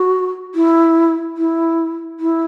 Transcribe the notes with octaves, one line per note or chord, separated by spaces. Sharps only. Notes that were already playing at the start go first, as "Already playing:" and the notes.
Already playing: F#4
E4
E4
E4